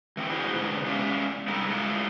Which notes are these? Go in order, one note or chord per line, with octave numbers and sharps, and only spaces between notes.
E3 A#3 C4
D4 E4 F#4 G#4 C5 D#5
G#2 B2 D3
E2 G#3 C#4 G4 E5 F5
C3 G3 D#4 A4 A#4
G#3 A3 E4 F4 G4 A4